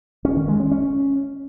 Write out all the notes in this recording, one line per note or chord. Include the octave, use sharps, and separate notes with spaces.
C#4
D#3
G#3
C#4
C#4